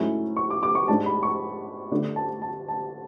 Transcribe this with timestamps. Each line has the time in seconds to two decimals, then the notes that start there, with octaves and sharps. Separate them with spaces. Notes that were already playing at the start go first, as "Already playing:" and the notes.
Already playing: G#2 F#3 A3 C#4 E4
0.37 C#6
0.50 D6
0.63 D6
0.75 C#6
0.88 G#2 G#3 D4 A5
1.06 B5
1.23 C#6
1.92 D3 A3 D4
2.16 A5
2.42 A5
2.68 A5